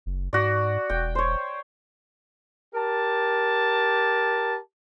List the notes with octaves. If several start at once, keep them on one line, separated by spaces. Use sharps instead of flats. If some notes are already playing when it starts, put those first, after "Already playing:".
F#1
G#2 F#4 D5
E1 G5
C5 C#5
G4 A#4 A5